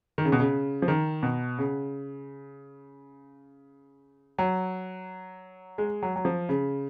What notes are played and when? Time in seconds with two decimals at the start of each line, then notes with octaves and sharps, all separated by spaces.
0.18 D#3
0.25 C#3
0.32 B2
0.40 C#3
0.82 F3
0.88 D#3
1.23 B2
1.59 C#3
4.38 F#3
5.78 G#3
6.03 F#3
6.16 F#3
6.25 F3
6.49 C#3